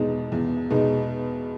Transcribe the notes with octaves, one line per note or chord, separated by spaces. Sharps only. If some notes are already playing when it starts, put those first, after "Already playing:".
Already playing: E2 B2 G#3 D#4
E2
B2 G#3 D#4